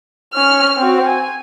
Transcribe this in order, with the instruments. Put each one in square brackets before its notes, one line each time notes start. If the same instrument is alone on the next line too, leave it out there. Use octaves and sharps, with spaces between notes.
[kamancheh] C#4 F6
C4 F#4
G#5